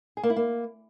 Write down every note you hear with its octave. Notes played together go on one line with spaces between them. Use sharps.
G#4
A#3
E4
A#3